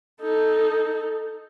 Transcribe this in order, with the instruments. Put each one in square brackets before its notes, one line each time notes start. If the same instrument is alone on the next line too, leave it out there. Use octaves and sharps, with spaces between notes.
[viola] D#4 A4